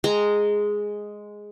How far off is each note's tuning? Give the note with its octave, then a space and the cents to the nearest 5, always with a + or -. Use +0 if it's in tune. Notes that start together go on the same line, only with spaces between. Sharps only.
G#3 +0 A#5 -15